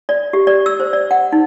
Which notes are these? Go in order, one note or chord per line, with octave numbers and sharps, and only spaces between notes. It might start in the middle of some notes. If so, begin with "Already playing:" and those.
D5
G4
D5
E6
C5
D5
F#5
D#4